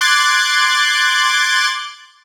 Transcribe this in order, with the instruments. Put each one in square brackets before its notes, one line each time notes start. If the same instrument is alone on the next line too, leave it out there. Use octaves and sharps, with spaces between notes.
[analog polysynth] C6 D6 F#6 G#6 A6